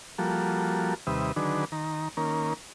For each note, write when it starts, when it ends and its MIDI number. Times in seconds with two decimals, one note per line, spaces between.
0.18 0.94 53
0.18 0.94 55
0.18 0.94 58
0.18 0.94 66
0.18 0.94 69
1.07 1.32 39
1.07 1.32 48
1.07 1.32 55
1.07 1.32 71
1.07 1.32 76
1.07 1.32 87
1.36 1.65 50
1.36 1.65 51
1.36 1.65 54
1.36 1.65 62
1.36 1.65 68
1.36 1.65 71
1.72 2.08 51
1.72 2.08 82
2.17 2.53 51
2.17 2.53 58
2.17 2.53 61
2.17 2.53 70